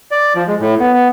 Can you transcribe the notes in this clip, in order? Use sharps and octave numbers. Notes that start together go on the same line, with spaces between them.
D5
F3
G#3
A2
B3
B3